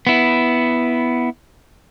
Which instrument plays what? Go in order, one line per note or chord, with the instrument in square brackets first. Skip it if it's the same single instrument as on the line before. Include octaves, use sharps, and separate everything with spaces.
[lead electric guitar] B3 E4